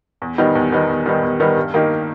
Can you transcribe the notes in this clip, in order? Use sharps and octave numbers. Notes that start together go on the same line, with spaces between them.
E2
D#3 G3 B3 D#4
E2
D#3 G3 B3 D#4
E2
D#3 G3 B3 D#4
E2
D#3 G3 B3 D#4
G2
D#3 A#3 D#4 G4